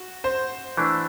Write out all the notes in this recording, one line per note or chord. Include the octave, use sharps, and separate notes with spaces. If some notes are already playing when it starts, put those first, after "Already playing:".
Already playing: F#4
C5
E3 A3 D4